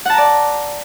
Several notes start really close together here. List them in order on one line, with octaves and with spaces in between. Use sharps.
F#5 A5 A#5 D5